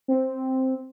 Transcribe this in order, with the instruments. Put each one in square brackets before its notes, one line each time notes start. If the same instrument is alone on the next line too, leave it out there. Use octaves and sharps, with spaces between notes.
[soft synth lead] C4